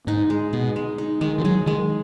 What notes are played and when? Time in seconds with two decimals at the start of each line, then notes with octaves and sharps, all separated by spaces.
0.07 G#2 D#4
0.30 G#3
0.53 B2 G#4
0.76 G#3
0.98 D#4
1.21 D#3 G#3
1.38 D#3
1.44 F#3 G#4
1.66 D#3 G#3